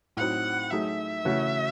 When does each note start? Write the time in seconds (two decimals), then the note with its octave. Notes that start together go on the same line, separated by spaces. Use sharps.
0.17 A2 F#3 C4 D#4 F#5
0.71 F#3 A3 D#4 G#4 E5
1.25 C#3 E3 A3 C#4 F#4